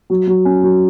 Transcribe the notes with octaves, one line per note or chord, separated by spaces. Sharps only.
F#3
F#3
C#4
F#3